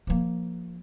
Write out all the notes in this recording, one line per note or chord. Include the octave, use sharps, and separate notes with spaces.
F3 A#3